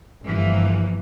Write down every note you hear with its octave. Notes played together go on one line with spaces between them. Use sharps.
G1 E3 F3 A#3